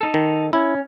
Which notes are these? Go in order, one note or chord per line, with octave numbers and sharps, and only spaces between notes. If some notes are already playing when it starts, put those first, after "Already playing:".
D#4 A4
D#3
C#4 E4